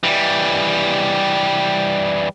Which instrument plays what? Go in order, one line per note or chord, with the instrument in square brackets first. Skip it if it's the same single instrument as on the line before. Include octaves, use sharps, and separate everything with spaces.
[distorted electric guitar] E3 G3